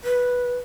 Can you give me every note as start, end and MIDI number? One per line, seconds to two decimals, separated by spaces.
0.04 0.57 71